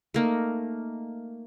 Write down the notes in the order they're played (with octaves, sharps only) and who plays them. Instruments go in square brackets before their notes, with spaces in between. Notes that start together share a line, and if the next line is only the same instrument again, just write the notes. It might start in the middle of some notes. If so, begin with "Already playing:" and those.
[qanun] A3 A#3 D#4